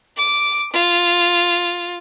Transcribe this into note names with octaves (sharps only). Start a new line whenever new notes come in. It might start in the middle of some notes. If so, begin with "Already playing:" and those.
D6
F4